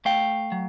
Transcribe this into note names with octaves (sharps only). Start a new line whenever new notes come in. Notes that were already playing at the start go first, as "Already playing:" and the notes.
A3 F5 G5
F#3